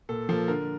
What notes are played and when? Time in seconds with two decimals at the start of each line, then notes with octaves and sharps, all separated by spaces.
0.09 A#2 A4
0.29 F3 A#3 A4
0.48 D3 A#4